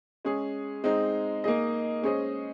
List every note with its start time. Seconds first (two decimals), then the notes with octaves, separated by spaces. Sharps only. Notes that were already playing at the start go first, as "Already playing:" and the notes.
0.25 G#3 C#4 G#4
0.84 G#3 C4 D#4
1.44 A#3 D#4 G#4 D#5
2.02 G#3 C#4 G#4 C5 D#5